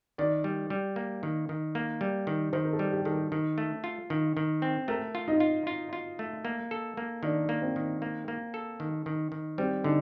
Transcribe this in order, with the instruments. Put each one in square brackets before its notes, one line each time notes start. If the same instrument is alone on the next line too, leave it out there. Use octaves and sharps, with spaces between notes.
[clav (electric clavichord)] D#3 [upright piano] D5
[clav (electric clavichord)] G3
G3
A#3
D#3
D#3
A#3
G3
D#3
[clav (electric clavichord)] D#3 [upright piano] C5
[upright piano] A#4
A4
[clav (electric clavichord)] G3
[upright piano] G4
[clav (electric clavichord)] D#3 [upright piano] A4
[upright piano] A#4
[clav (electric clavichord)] D#3
A3
F4
D#3
D#3
C4
[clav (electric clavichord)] A3 [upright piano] A#4
[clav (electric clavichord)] F4
[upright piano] D#4
[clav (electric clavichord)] F4
F4
F4
A3
A#3
A4
A#3
[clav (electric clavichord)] D#3 [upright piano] D4
[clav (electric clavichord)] A#3
[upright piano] C4
[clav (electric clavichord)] D#3
A#3
A#3
A4
D#3
D#3
D#3
[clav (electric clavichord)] G3 [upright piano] C4
[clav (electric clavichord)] D3 [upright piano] D#4